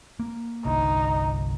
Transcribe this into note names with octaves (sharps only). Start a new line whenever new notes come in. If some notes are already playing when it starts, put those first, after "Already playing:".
A#3
G1 C2 D3 D#4